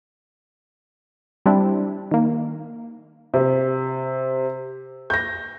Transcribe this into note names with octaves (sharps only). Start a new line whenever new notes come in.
G3 C4 D4 E4
D#3 A#3
C3
G6 A#6